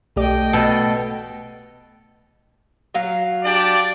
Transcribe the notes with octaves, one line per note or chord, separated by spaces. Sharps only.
B1 A3 G4 D5 D#5 G5
B2 A4
F#3 F5
D4 G4 D5